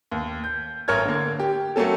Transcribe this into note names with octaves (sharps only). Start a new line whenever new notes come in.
D#2
G6
A1 A#4 C#5 F6 G#6
D3 A#3
G4
F#3 A3 A#3 C#4 A4